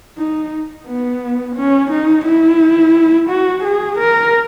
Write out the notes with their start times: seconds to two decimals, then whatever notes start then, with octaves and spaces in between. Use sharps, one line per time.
0.18 D#4
0.87 B3
1.56 C#4
1.91 D#4
2.25 E4
3.29 F#4
3.64 G#4
3.99 A#4